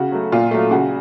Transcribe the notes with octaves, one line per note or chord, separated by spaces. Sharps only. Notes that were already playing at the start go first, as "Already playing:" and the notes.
Already playing: C#3 F#4
F#3 A3
A#2 F4
F#3 A3
C#3 F#4